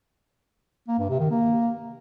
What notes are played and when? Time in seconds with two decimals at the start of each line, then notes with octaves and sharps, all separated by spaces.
0.88 A#3
0.99 G2
1.09 C3
1.20 D#3
1.31 A#3